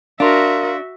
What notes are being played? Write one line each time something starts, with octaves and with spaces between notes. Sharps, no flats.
D4 F#4 A#4 E5 F5 C6